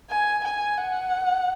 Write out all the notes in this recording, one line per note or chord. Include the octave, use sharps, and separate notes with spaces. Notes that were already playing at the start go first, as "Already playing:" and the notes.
G#5
G#5
F#5